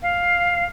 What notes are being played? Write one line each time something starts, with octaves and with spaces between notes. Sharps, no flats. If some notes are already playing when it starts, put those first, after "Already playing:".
F5